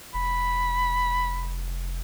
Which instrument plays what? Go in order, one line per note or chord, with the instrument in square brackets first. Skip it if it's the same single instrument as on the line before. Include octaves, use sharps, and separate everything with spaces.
[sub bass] F1 [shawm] B5